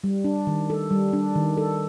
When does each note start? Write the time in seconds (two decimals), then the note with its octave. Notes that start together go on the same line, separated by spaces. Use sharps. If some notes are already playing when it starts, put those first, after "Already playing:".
0.04 G3
0.24 D4
0.47 D#3
0.70 A4
0.91 G3
1.13 D4
1.35 D#3
1.57 A4